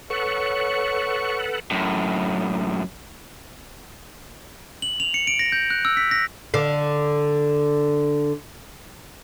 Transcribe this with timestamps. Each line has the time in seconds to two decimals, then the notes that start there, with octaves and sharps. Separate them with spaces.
0.10 A4 B4 C#5 F#5 C#6
1.71 F#2 A2
4.82 F#7
5.00 F7
5.14 C#7
5.27 D7
5.39 A#6
5.52 G6
5.70 F#6
5.85 E6
5.97 B6
6.11 A#6
6.54 D3 F5